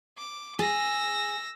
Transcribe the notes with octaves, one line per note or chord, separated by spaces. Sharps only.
D6
G#4 E6 A#6